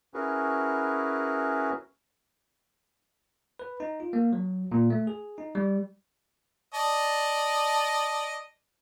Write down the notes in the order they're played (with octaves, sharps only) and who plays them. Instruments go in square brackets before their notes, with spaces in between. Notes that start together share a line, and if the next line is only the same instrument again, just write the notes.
[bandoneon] C#4 E4 F#4 G#4 A#4 B4
[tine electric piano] B4
D#4
F4
A#3
F#3
A#2
A3
G#4
D#4
G3
[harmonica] D5 D#5 A5